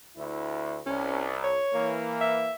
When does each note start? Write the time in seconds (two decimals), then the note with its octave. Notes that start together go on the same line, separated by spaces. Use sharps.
0.16 D2 E4
0.86 C2 C#4
1.44 C#5
1.72 E3 A#3
2.21 E5